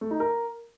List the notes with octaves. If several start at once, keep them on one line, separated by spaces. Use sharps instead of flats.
A3
D#4
A#4